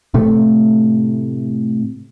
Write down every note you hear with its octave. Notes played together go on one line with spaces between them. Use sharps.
A2 C3 A3